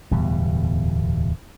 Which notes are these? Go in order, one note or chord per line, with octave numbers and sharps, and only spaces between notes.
D1 E2 B2 G3